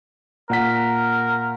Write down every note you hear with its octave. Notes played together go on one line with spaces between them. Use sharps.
A#2 A#4 F#5 B6